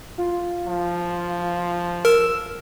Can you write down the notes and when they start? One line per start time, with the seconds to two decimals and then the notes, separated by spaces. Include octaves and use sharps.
0.18 F4
0.67 F3
2.05 A#4 E6